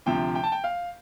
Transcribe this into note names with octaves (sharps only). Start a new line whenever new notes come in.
D2 C3 F3 G5
G5
A5
G5
F5